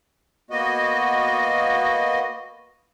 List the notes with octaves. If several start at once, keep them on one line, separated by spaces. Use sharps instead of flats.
A#3 B3 F#4 D#5